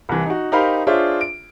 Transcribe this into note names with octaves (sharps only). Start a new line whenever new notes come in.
C2 E3
D#4 F#4
D#4 G4 A#4 C5 F5 B5
D4 F4 G#4 C5 C#5 E5
D7